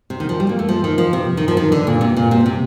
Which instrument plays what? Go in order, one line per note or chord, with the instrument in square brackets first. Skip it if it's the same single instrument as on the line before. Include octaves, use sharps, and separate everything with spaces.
[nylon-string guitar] C3
D#3
F3
G3
A#3
A3
F3
D#3
F3
C3
D#3
F3
D#3
D3
A#2
C3
A#2
C3
C3